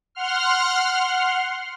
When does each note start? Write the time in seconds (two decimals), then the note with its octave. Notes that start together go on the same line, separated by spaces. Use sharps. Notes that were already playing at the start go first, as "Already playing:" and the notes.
0.15 F#5 C6 F6